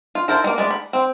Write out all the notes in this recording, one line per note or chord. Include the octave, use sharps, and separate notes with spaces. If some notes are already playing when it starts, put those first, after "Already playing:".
F4
E4 A#4 C5 A5
G#3 A#3
G#3 A3 D5
B5
C4